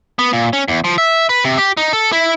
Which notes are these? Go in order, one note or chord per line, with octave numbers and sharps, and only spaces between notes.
B3
A#2
C#4
E2
F3
E5
B4
C3
G4
D#4
A4
E4